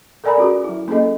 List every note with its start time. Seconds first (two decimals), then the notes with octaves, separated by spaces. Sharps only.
0.24 A4 A#4 D5 G#5 A#5 B5
0.37 C#4 F4 F#4 G#4
0.64 F#3 E4
0.88 A#3 C#4 G#4 A4 D#5